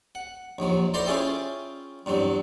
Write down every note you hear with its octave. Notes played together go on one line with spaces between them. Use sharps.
F#5
A#1 D#2 F3 F#3
E4 A4 C5 D5 A#5 C6
C#4 E4 F4 G#4 E5 G5
E2 G2 F#3 C4